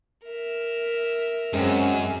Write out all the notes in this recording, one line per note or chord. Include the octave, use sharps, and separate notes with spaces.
A#4 E5
F#2 G#3 C4 C#4